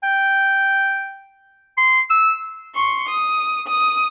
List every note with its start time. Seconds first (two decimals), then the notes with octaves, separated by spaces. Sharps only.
0.04 G5
1.78 C6
2.10 E6
2.75 C6 C#6
3.08 D#6
3.68 D#6